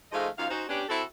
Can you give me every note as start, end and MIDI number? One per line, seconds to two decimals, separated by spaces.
0.12 0.27 44
0.12 0.27 53
0.12 0.27 56
0.12 0.27 57
0.12 0.27 75
0.12 0.27 77
0.37 0.49 42
0.37 0.49 63
0.37 0.49 65
0.37 0.49 77
0.49 0.63 61
0.49 0.63 63
0.49 0.63 66
0.49 0.63 72
0.68 0.83 59
0.68 0.83 61
0.68 0.83 62
0.68 0.83 67
0.89 1.03 60
0.89 1.03 64
0.89 1.03 66
0.89 1.03 69